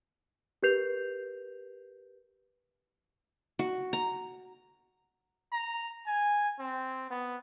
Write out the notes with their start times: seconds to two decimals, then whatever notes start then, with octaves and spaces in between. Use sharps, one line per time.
0.63 G4 A#4 B4 G6 C7 F7
3.59 F#4
3.93 A#5
5.52 A#5
6.07 G#5
6.59 C4
7.10 B3